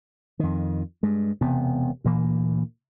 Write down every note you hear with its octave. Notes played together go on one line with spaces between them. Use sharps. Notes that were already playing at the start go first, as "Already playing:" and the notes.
F2 D#3
G2 G#3
E1 C3 B3
D2 A#2 E3 A#3